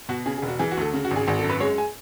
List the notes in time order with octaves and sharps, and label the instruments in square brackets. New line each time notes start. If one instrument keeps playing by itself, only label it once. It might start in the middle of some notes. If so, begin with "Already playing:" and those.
[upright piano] B2 F#4
C#3 G#4
G#4
E1
F#4
E3 G#4
F#4
D2 A4
C#3
F#4
G#1
G#4
G#1 G#4
A4
F#2
B4
G#3 C#5
G#5